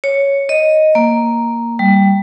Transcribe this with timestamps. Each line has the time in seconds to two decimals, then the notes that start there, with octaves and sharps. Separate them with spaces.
0.04 C#5
0.49 D#5
0.95 A#3
1.79 G3